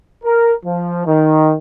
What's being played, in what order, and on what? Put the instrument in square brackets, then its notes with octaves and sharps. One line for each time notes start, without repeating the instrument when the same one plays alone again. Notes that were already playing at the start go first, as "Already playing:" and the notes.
[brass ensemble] A#4
F3
D#3